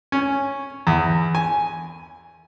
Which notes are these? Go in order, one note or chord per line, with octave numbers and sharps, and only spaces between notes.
C#4
E2
G#5